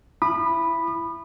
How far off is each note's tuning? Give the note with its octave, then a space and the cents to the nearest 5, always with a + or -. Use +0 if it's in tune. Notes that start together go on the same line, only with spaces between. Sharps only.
E4 +20 B5 +0 D#6 -40